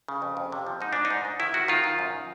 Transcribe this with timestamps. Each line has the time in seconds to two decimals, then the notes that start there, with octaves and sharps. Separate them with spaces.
0.08 C#3
0.22 F2
0.37 F2
0.52 C3
0.67 F3
0.80 G#2 D#4
0.93 G#2 D4
1.05 D#4
1.10 G#2
1.25 G#2
1.40 D#3 E4
1.54 D#3 F#4
1.68 D#3 F4
1.84 D#3
1.99 F#2